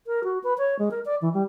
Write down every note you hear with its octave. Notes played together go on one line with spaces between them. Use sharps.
A#4
F#4
B4
C#5
G#3
A#4
D5
E3
G3